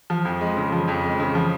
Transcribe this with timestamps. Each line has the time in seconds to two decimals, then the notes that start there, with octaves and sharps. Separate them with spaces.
0.10 F3
0.25 F2
0.41 G#3
0.57 C#3
0.72 F3
0.88 F2
1.03 G#3
1.20 C#3
1.35 F3